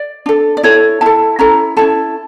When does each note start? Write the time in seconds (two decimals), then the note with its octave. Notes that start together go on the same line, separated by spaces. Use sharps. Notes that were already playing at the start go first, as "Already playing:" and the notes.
Already playing: D5
0.26 D4 A4
0.57 D5
0.63 E4 A4 C#5
1.01 E4 A4 A5
1.39 C#4 E4 A4 A#5
1.77 C#4 E4 A4 A5